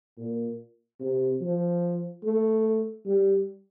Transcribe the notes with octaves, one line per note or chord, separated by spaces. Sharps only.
A#2
C3
F3
A3
G3